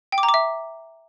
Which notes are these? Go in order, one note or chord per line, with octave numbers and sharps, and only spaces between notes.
G5
D6
A#5
D6
E5